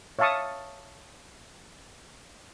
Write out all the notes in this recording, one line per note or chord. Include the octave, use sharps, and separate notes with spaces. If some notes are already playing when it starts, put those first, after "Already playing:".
C#5 E5 F5 A5 C#6 D#6